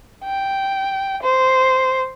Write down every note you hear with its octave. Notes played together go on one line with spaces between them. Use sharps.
G5
C5